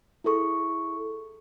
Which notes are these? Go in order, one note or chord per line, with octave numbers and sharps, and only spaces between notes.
E4 G#4 A4 C#6